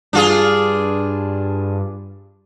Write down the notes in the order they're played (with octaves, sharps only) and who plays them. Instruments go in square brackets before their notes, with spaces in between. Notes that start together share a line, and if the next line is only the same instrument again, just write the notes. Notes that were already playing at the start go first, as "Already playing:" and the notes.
[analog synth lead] G2 [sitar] D4 F4 G#4